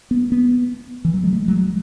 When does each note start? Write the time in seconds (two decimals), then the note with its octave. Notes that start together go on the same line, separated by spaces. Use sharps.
0.11 B3
0.32 B3
1.05 E3
1.14 F#3
1.23 G#3
1.33 A3
1.48 F#3
1.53 G#3